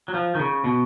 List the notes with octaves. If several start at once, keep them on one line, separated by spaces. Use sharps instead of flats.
F#3
F3
D#3
C#3
B2